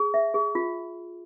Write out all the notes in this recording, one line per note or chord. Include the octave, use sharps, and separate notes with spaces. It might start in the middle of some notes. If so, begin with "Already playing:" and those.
Already playing: G#4
E5
G#4
F4